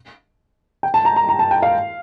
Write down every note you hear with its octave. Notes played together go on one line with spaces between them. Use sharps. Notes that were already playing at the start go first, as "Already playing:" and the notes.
G5
A5
A#5
A#5
A#5
A5
G5
F5